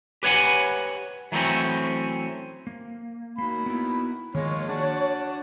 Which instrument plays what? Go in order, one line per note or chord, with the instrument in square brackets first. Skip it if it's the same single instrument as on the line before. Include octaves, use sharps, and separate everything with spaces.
[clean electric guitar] G4 B4 C#5 D#5 F#5 G#5
E3 F#3 A3 C4 C#4
[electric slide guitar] A#3
[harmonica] D#3 F#3 B5 [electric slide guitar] A#3
[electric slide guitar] B3 E4
[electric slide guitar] D#3 F3 A#3 [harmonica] G#3 F4 [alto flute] C#5
[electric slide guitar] D4 F#4 [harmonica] D5 F#5 A5